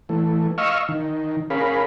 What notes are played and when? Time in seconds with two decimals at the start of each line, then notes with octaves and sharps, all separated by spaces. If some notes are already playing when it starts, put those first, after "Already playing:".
0.09 E3 A3
0.58 D#5 F5 C#6 E6 F6
0.89 D#3
1.50 C#4 G#4 A#4 F5 B5